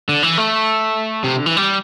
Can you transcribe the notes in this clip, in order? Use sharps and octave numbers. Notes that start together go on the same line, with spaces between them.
D3
E3
A3
C3
D3
E3
G3